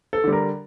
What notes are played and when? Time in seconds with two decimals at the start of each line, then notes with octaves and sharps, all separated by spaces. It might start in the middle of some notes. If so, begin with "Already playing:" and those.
0.13 A4
0.24 D3 G3
0.33 A#4